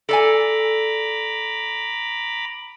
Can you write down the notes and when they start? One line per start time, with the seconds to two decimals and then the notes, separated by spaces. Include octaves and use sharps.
0.09 A4 D5 G#5 A#5 B5 D6